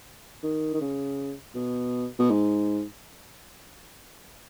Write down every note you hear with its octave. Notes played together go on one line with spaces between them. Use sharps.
D#3
D#3
C#3
B2
B2
G#2